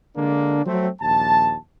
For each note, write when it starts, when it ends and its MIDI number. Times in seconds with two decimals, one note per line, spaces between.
0.15 0.60 50
0.15 0.60 56
0.15 0.60 58
0.15 0.60 62
0.64 0.88 54
0.64 0.88 57
0.64 0.88 60
1.00 1.54 34
1.00 1.54 39
1.00 1.54 81